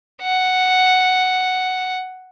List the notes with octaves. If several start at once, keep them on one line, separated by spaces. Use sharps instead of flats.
F#5